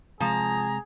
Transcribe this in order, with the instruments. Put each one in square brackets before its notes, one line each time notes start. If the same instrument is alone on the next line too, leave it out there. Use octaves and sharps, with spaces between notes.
[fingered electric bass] C3 G#3 [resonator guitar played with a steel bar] F3 A5 [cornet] G#4 [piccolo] A#5